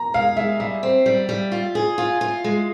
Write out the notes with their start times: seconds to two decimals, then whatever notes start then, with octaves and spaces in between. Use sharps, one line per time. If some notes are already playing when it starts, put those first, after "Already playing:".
Already playing: A#5
0.14 G#3 F5
0.37 G#3 E5
0.60 G3 E5
0.83 C4
1.06 G3
1.29 G3
1.52 F4
1.75 G#4
1.98 F4
2.21 F4
2.44 G#3